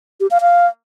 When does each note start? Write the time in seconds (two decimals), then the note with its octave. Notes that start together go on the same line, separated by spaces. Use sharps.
0.20 G4
0.31 F5
0.41 F5